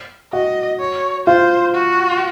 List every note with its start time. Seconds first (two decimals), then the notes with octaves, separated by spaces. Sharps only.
0.33 F#4 D#5
0.80 C#5
1.27 F4 C5
1.73 F#4